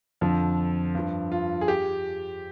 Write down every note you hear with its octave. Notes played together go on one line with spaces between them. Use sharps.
F2 D3 F3
G2 F3
F4
G#4
G4